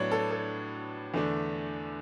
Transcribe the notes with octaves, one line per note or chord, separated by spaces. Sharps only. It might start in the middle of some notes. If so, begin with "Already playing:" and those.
Already playing: A2 F#3 B3 D4 C#5 D5
A4
A4
E2 D3 A3 D4